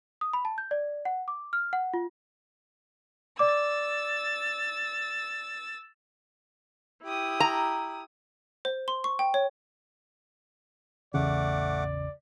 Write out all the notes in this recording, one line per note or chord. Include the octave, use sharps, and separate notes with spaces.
D#6
B5
A5
G6
D5
F#5
D6
F6
F#5
F4
D5 D6 E6 A6
E4 G4 D#6
A#5
C5
C6
C#6
G5
C#5
A1 E2 C#3 E3 A3 D5 F#5 D6